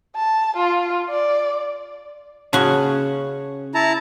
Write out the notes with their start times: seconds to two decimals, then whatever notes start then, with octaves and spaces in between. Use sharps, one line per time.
0.16 A5
0.57 F4
1.10 D5
2.53 C#3 C#4 F#4 C#5 A5
3.75 E4 A5 A#5